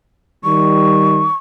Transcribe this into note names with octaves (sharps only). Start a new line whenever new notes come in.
D#3 G3 C#6